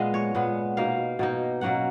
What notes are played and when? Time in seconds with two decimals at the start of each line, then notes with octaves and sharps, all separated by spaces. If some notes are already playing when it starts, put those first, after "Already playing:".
Already playing: A#2 G#3 B3 D#5 F5
0.14 C#5
0.34 A#2 G#3 B3
0.77 B2 A#3 D#4 F5
1.19 B2 A#3 D#4
1.61 B2 F#3 A#3 C#4 F#5